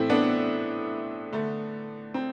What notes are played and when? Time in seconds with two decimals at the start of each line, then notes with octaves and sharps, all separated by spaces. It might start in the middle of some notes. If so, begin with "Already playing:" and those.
Already playing: A2 E3 A3 C4 E4
0.10 B3 D4
1.32 D3 A3
2.14 C4